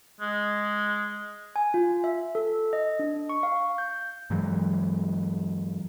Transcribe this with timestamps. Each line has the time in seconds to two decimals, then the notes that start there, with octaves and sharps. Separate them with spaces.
0.20 G#3
1.56 G#5
1.74 F4
2.04 E5
2.35 A4
2.73 D#5
2.99 D4
3.29 C#6
3.43 F5
3.78 G6
4.30 G2 E3 F#3 G#3